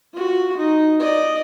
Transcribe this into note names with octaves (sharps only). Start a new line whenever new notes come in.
F4 F#4
D#4
D5 D#5